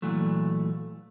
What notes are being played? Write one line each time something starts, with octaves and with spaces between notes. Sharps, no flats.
A#2 E3 F#3 A3